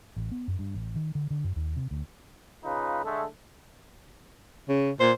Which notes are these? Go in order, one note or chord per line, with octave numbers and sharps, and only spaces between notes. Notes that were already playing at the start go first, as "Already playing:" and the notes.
A1
B3
F#2
G2
A1
D#3
D3
D3
F#2
D#2
C3
D2
C#3 D#4 F4 B4
D3 G#3 A3
C#3
A#2 C5